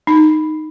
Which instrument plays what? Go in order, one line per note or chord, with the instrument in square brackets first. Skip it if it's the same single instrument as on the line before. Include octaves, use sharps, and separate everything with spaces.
[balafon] D#4